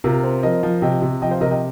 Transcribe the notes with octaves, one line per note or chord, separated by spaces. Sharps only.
C3 F4 A#4
C4
F3 A#4 D#5
F3
C3 D#5 G5
C3
F3 D#5 G5
C5 F5
C3 A#4 D#5
D#5 G5